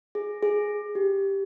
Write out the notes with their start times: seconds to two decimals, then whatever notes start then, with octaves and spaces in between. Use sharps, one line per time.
0.15 G#4
0.43 G#4
0.95 G4